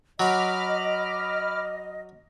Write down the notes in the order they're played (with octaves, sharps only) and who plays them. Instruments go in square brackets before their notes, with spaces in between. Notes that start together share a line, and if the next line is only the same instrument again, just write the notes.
[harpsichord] F#3 [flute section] D#5 [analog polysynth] B5 D6 F6